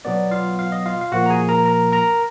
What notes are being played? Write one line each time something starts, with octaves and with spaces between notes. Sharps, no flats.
B2 F#3 B3 D5
F4 F5
F5
D#5
F4 F5
F5
A#2 F3 A#3 F#4 F#5
A#5
G#4 G#5
A#4 A#5
A#4 A#5
A#4 A#5